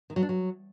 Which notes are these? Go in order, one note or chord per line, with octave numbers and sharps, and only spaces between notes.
D#3
F#3
D4
F#3